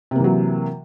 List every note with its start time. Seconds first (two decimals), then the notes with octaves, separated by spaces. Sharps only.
0.11 C3
0.16 A#3
0.20 E3
0.24 F#3